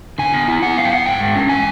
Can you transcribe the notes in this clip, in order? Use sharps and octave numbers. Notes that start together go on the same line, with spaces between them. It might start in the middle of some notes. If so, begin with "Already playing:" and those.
D3 G#5
B3
E4
B3 F#5
F#2 F5
G5
B3 F#5
G#2 G5
G#3
C#4
E3 G#5